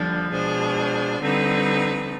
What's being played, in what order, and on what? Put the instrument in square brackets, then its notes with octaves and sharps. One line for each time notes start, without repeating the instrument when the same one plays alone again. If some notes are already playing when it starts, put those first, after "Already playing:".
Already playing: [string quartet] D#2 D3 G3 D4 [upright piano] F3
[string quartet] B2 G#3 D4 G#4 C5
D3 G3 C4 D#4 B4